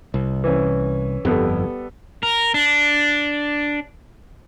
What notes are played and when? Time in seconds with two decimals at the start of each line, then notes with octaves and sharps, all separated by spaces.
0.14 C2
0.44 E3 C#4
1.25 G1 F2 G3 B3 A4
2.23 A#4
2.54 D4